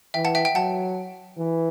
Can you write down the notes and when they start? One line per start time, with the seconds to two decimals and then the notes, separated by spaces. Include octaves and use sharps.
0.14 E3 E5 G5
0.25 F#5 A5
0.35 E5 G5
0.45 E5 G5
0.55 F#3 F#5 A5
1.38 E3